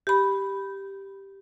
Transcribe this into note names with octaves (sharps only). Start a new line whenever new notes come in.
G4 B5